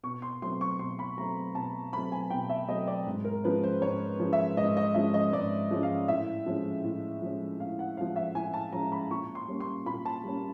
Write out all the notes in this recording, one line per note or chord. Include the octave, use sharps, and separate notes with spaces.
B2 C#6
C6
F#3 A3 C4 C6
C#6
B2 C6
B5
F#3 A3 C4 A#5
B2 A5
F#3 A3 C4 B5
G#5
B2 G5
E5
F#3 A3 C4 D#5
D5
G#2
A#4
F3 G#3 C#4 B4
C5
G#2 C#5
F3 G#3 C#4
E5
G#2 D#5
D#5
F3 G#3 C#4 E5
D#5
G#2 D5
F3 G#3 C#4
F5
A2 E5
F3 G#3 C#4
A2
F3 G#3 C#4
A2 F5
F#5
F3 G#3 C#4 F5
E5
A2 G#5
A5
F3 G#3 C#4 A#5
B5
A#2 C#6
C6
G3 A#3 C#4
C6
A#2 B5
A5
G3 A#3 C#4